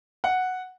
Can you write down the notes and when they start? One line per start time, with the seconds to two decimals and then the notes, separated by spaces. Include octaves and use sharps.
0.24 F#5